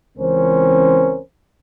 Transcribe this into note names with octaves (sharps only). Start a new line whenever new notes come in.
C#2 E3 C4 C#4 A#4 C5